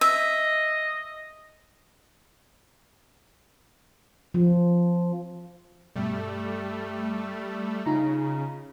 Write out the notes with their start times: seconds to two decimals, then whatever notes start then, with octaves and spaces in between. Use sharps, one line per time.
0.01 D#5 E5
4.34 F3
5.96 G2 B2 G3 A3
7.86 C#3 D#4 F4 A#5